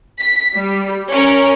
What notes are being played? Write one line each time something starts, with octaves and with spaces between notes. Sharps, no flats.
B6
G3
C#4 A#4